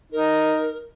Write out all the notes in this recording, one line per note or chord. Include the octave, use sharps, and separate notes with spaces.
D#4 A#4